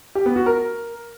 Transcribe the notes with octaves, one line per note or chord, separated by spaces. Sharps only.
G4
B3
F#4
A#4